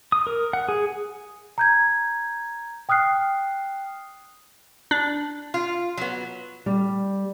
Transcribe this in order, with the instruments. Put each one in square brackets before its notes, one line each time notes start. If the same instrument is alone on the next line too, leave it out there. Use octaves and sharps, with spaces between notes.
[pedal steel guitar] D#6
A#4
F#5
G#4
[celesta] A#5 G6 G#6
G5 D#6 F6 F#6 C7
[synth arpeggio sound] D4
[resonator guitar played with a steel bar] F4
F#3 B3
[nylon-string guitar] G3